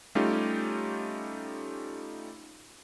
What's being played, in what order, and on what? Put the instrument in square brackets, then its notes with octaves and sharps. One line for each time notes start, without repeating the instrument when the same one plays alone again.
[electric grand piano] G3 A3 C#4 D#4 F4 G4